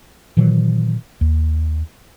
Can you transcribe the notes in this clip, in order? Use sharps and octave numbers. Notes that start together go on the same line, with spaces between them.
A#2 D#3 E3 F#3
D#2